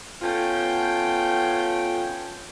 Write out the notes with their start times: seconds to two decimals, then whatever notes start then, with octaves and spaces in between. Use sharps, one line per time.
0.22 A3 B3 C#4 F4 G5